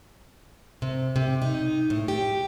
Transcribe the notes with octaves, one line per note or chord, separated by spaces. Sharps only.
C3
C3
D#4
A2
G4